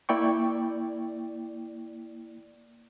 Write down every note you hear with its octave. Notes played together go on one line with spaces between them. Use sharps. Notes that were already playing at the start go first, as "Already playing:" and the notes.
A#3 E4 D5 G5 C#6